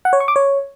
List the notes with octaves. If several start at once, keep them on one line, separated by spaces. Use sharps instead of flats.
F#5
C#5
C#6
D6
C#5